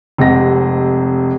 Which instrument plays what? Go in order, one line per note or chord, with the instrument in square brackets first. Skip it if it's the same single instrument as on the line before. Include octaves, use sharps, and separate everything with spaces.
[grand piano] F1 C3 G#3 F#5 A#6